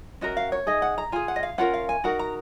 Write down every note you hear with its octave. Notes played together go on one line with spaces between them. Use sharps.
C#4 F#4 A#4 D#5
F5
C#5
D#4 G#4 D#5
F#5
A#5
F4 G#4 G#5
F#5
D#5
F5
C#4 F4 A#4 F#5
F5
G#5
D#4 F#4 A#4 F#5
A#5